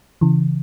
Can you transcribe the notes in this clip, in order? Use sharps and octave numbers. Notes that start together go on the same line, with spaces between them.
C#3 E3